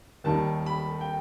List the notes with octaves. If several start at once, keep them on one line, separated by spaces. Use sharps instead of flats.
D#2 D#3 G3 A5
B5
G5